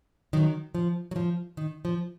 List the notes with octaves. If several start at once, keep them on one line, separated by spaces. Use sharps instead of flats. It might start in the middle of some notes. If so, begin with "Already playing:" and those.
D#3 F#3
F3
F#3
F3
D#3
F3